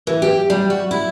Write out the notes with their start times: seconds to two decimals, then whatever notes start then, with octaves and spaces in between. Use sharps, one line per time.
0.07 E3
0.22 G4
0.50 G3
0.70 F#4
0.91 E4